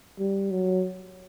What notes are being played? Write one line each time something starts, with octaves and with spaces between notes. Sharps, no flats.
G3
F#3